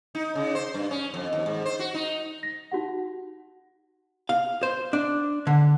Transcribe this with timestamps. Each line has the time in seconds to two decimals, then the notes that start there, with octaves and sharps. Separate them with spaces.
0.15 D#4
0.35 C#3
0.55 C5
0.74 G2
0.91 C#4
1.14 F2
1.33 D#2
1.46 G#2
1.65 C5
1.79 F#4
1.94 D#4
2.43 A#6
2.72 D#4 F#4 G4 F#5
4.29 F5
4.63 C5
4.93 D4
5.47 D3